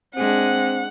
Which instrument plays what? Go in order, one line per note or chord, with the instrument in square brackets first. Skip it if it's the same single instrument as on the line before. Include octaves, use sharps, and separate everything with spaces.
[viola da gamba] G#3 D4 [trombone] C4 [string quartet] F#5